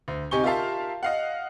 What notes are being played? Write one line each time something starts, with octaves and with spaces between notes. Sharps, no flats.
D2
C3 D#4 G4 G#5 C#6 G7
F4 G4 A#4 E5 F5 A5
D#5 F5 F#5